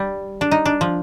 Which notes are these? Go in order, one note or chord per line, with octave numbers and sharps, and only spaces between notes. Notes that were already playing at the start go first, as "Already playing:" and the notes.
Already playing: G3
D4
D#4
D4
F3